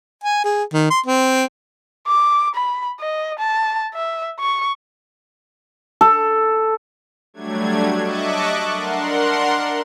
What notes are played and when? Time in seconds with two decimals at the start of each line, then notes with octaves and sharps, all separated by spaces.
0.24 G#5
0.45 G#4
0.73 D#3
0.90 C6
1.06 C4
2.07 D6
2.55 B5
3.00 D#5
3.39 A5
3.94 E5
4.40 C#6
6.01 A4
7.34 F#3 G3 A3 D4 G#6
7.99 D#5 E5 A5 C#6 D6 F#6
8.73 D4 A#4 F#5 C6